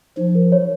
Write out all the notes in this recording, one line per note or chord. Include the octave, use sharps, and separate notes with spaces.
F3 D#4
A#4
C#5